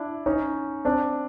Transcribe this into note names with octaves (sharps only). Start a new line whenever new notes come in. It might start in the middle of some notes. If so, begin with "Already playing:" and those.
Already playing: D4 E4
C#4 D#4
C4 D4